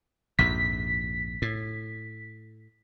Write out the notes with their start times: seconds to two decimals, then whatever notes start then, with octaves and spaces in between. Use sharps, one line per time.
0.39 A#1 F2 G#2 B6
1.42 A2